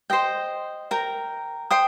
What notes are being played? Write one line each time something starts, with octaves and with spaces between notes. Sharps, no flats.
C5 D#5 G5
A#4 G5 A#5
C5 G5 D#6